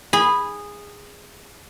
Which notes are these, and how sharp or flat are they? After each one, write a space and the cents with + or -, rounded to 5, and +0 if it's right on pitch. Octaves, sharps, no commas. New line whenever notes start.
G#4 -15 B5 +0